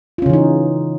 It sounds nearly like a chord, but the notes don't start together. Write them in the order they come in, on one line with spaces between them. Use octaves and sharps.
F4 C#4 C#3 E3 D#4